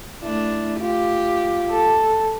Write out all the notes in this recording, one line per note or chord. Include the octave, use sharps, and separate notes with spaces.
A3 D4 E4
F4 G4
A4